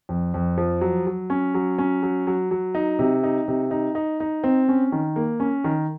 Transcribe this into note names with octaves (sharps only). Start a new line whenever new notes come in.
F2
F2
F3
F#3
F#3
C#4
F#3
C#4
F#3
F#3
F#3
D#4
C3
D#4
C3
D#4
D#4
D#4
C4
C#4
D#3
A#3
C#4
D#3